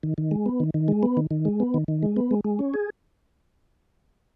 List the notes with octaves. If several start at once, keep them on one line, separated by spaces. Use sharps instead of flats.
D#3
D#3
G#3
B3
D#3
D#3
G#3
B3
D#3
D#3
G#3
B3
D#3
D#3
G#3
B3
G#3
G#3
C#4
G#4